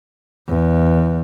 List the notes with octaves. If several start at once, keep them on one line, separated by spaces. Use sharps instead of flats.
E2